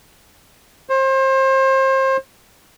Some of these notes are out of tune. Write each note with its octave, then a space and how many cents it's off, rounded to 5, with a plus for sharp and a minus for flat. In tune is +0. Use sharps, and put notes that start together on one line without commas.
C5 +30